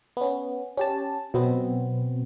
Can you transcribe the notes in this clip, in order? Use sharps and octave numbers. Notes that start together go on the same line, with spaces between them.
B3 C#4
C#4 G4 A5
B2 F#3 B3 C4